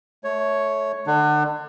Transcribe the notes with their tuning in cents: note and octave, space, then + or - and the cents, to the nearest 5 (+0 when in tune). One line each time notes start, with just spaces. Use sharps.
A3 -20 C#5 +0
D3 +35 D4 +35